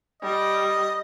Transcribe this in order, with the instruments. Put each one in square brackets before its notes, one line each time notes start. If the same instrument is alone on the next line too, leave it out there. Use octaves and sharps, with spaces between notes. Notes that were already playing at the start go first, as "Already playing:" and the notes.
[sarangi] G3 [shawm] D#5